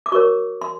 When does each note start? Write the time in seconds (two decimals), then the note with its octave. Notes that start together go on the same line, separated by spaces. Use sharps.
0.06 D6
0.12 F#4 A#4 C#5 C#6
0.61 C6